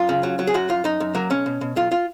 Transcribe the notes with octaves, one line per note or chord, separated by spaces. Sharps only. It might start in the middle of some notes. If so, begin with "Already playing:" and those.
Already playing: F#2 F4
C#3
F#3
F#3
G#4
F#2 F#4
F#2 F4
F#2 D#4
F#2
F#3 A#3
B1 C#4
B2
B2
B1 F4
F4